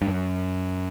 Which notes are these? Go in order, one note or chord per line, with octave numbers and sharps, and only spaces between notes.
G2
F#2